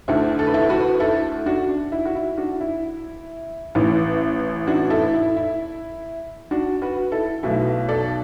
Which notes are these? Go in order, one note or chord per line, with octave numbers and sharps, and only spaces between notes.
D2 D3 A3 E4
A4
B4
E4 A4
F#4 B4
E4 A4
D4 F#4
D4
E4
F#4
E4
D4 F#4
E4
A1 A2 E3
D4 F#4
E4 A4
E4
E4
D4 F#4
F#4 B4
E4 A4
B1 B2 A3 E4
A4 D5